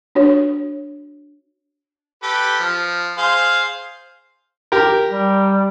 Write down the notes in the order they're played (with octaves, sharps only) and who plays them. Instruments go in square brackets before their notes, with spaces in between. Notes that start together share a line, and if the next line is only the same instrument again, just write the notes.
[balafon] D4 F#4 C#5
[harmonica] G4 A4 B4
F3
G#4 C5 F5
[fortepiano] G4 A#4
[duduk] G3